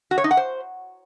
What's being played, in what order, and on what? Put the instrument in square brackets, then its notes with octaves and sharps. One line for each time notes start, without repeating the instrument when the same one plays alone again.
[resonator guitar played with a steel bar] F#4
C#5
D#4
F#5
C5